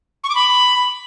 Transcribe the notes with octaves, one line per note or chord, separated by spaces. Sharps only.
C#6
D6
B5